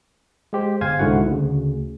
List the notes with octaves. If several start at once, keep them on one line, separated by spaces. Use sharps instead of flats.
G#3 G4 C5
G1 C5 F5 G#5 G#6
C2 G#2 D3 E4 F#4 F#5
D2 C#3